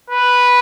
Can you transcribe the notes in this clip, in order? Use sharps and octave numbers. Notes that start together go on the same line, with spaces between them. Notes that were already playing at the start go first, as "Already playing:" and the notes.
B4